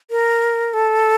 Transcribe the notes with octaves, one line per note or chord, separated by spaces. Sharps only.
A#4
A4